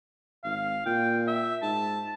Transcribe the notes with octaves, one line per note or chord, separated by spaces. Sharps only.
G#1 F5
A#2 G5
E5
G#2 A5